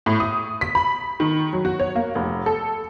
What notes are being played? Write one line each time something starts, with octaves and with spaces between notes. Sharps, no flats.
A2
D#6
B6
B5
D#3
F#3
F#4
C#5
A#3
F1
A4